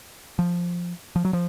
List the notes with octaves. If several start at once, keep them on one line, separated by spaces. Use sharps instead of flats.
F3
F3
F#3
F3